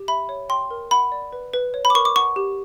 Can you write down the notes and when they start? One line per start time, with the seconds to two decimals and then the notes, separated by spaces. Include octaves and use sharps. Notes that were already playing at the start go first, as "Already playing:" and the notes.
Already playing: G4
0.08 E5 B5
0.29 C#5
0.49 G5 C6
0.71 A#4
0.91 F#5 B5
1.12 D5
1.33 B4
1.53 B4
1.74 C#5
1.85 B5
1.90 D6
1.95 A#4 C#6
2.05 D6
2.16 F#5 C#6
2.36 G4